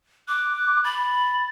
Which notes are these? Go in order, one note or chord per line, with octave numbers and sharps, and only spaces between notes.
D6 F#6
F#6
B5 A6